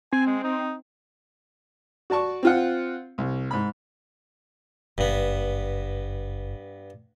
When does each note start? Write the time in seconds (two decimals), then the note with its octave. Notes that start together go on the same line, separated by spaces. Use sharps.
0.13 C4 G#5
0.27 G#3
0.44 D#4
2.10 F#4 D5 A5 C#6
2.43 C4 F4 F#5
3.18 C2
3.51 G#2 B5
4.98 F#1 G2 B3